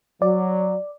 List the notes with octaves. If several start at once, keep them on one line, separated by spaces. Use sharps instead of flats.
F#3 D5